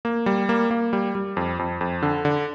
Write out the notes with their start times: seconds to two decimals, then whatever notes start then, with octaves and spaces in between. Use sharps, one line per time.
0.05 A#3
0.26 G3
0.49 A#3
0.71 A#3
0.93 G3
1.15 G3
1.37 F2
1.59 F2
1.81 F2
2.02 D3
2.25 D3